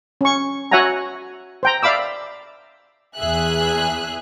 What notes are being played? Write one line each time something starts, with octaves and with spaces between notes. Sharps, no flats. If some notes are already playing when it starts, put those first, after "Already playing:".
C#4 C#6
F#4 C#5 E5 F#5 G#5 A#5
C5 G5 A#5
D5 E5 F5 B5 D6 E6
E2 G#4 E5 F#6